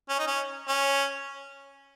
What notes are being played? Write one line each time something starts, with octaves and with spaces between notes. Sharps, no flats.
C#4
D#4
C#4
C#4